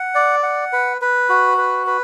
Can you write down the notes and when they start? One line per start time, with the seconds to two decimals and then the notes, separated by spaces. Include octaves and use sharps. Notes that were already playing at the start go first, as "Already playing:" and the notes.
Already playing: F#5
0.15 D5
0.43 F#5
0.73 B4
1.02 B4
1.29 F#4
1.58 B4
1.87 B4